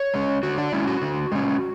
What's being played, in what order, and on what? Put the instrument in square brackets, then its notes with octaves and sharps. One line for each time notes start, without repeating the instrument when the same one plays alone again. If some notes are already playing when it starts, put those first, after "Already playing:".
Already playing: [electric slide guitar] C#5
G#3 C#4
D3 F#4
D4
G#3 C#4 E4
F#4
D3
G#3 C#4